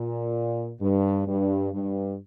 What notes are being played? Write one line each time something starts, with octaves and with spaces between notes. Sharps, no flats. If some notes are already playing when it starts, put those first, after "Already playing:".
Already playing: A#2
G2
G2
G2